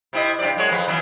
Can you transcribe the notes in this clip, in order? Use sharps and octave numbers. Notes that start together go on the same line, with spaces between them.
C3 E4 D#5
G2 C3 D5
F#2 G#3 C#5
F2 F3 B4
E3 F#3 B3